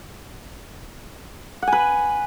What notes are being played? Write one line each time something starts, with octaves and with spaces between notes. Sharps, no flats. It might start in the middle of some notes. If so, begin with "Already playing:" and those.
F#5
G#5
B4